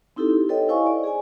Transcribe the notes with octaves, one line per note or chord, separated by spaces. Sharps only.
C4 D#4 E4 G4 A4
G4
A4 B4 C#5 D#5 G5
E4 C5 D#5 F5 G#5 C#6
D5
G#4 D5 G#5